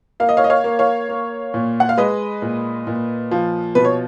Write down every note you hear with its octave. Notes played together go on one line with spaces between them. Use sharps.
A#3 F5
D#5
C#5 F5
D#5
C#5 F5
A#3
C#5 F5
A#3
A#2
F#5
F5
G#3 B4 D#5
A#2
A#2
F3
B2 B4
C#5